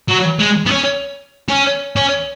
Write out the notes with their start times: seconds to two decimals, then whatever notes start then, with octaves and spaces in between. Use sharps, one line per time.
0.08 F#3
0.39 G#3
0.66 B3
0.71 C#4
1.48 C#4
1.96 C#4